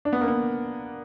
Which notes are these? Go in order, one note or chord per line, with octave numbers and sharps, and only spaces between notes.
D4
B3
A#3
B3